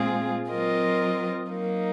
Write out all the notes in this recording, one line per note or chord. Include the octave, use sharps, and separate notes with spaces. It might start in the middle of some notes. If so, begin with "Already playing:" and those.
Already playing: A#2 G#3 C4 F4 G#4
F#3 C4 F4 A#4 D#5
F#3 A#3 D#4